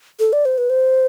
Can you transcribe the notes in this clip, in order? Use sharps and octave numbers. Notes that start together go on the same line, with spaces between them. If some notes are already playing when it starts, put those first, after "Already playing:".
A4
D5
C5
B4
C5